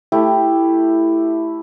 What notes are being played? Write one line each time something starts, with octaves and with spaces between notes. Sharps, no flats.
A3 E4 G4